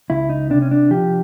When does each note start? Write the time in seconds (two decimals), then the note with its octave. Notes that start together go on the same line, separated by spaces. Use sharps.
0.10 C#2 E4
0.29 D#4
0.50 C3 D4
0.62 C#4
0.71 D4
0.91 F3 G4